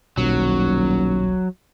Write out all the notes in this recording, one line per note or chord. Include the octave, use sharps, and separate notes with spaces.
D#1 B1 F#3